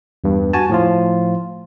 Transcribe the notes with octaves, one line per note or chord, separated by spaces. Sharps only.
E2 G2
F#4 G#5 A5
A2 F3 F4